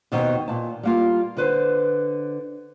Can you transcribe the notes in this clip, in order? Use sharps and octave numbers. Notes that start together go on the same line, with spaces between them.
D#2 B2 D#3 C4
A#2 A5
G3 A#3 F4
D3 B4 C5